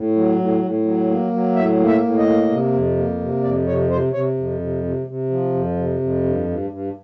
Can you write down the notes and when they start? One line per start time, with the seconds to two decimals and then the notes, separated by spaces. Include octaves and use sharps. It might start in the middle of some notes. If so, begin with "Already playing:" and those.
Already playing: A2
0.16 F#3
0.39 A2
0.63 A2
0.85 F#3
1.09 A#3
1.32 F#3
1.55 A2 E5
1.80 A#3
1.87 E5
2.02 A2
2.18 D#5
2.27 A#3
2.50 C3
2.73 F2
2.96 A#3
3.20 C3
3.43 F2 D5
3.67 C3 C#5
3.90 C3 C5
4.13 C3 C#5
4.37 F2
4.59 C3
4.83 C3
5.07 C3
5.30 F3
5.54 F2
5.77 C3
6.00 F2
6.23 G2
6.47 G2
6.70 G2